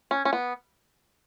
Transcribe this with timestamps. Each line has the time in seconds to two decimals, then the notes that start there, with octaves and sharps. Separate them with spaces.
0.11 C#4
0.25 C#4
0.33 B3